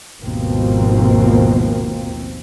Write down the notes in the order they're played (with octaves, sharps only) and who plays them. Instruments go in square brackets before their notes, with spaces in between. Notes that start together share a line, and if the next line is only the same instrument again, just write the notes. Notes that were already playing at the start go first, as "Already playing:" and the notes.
[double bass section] G#1 D#2 B2 F3 A#3 C4